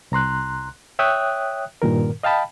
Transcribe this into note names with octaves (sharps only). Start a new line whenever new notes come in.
C2 A#5 C6 F#6
C#5 E5 G5 D#6 F#6
G2 A#2 D#3 A#4
D#5 F5 G5 A5 B5